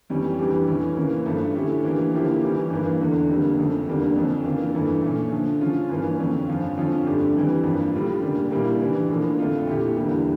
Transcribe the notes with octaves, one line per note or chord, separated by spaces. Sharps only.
F2 E3 G3 C#4
F2 E3 G3 D4 G4
A2 E3 A3 C#4
C#3 E3 A#3 C#4
G2 F3 A3
D3 A3 C#4 E4 G4
E3 A#3 D4 G4
D3 F3 A#3 E4 G4
E3 G3 C#4 G4
G2 E3 A#3
E2 D3 A3 D4
F2 D3 G3 A#3
F2 C#3 F3 A3
E2 D3 G3 A#3 D4
F2 D3 F3 C#4
C#3 E3 A#3 D4 F4
G2 E3 A3
A#2 A3 C#4
D3 F3 A3
C#3 F3 C#4 F4
G2 E3 A#3 C#4
F2 D3 F3 C#4
G2 F3 C#4 F4
F2 D3 F3 C#4 F4
G2 D3 A3 D4 G4
F2 E3 G3
G2 F3 A#3
A2 G3 D4 F4
C#3 G3 A#3 D4
A#2 G3 A#3 E4
C#3 E3 G3 D4
A2 F3 A#3 D4
F2 D3 A3 D4 F4
A#2 A3 E4 G4
E2 D3 G3 A#3 E4